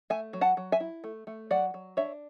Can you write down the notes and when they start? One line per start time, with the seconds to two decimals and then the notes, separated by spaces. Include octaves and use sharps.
0.10 A3 E5 G#5
0.33 F#3
0.41 F#5 A5
0.57 F#3
0.72 E5 G#5
0.80 E4
1.04 A3
1.27 A3
1.51 F#3 D5 F#5
1.74 F#3
1.97 D4 C#5 E5